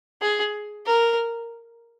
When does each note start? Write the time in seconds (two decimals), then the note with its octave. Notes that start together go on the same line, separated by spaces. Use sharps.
0.22 G#4
0.87 A#4